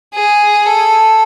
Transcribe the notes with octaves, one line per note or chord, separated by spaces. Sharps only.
G#4
A4